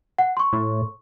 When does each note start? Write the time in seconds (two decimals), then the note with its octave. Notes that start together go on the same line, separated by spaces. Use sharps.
0.18 F#5
0.37 C6 C#6
0.53 A2